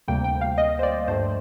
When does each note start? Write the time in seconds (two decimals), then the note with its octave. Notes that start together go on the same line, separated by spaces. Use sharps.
0.08 D2 C3 G3 A#3 G5
0.24 G5
0.41 F5
0.58 D#5
0.79 C5
0.83 D5
1.08 G2 F3 A3 C5